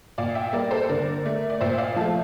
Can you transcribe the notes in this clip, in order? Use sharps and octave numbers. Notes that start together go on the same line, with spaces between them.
A#2 D5 F5
E5 G5
G3 A#3 A#4 D5
A4 C5
D3 A#4 D5
A3
D5
A#2 C5 E5
D5 F5
F3 A3 F5 A5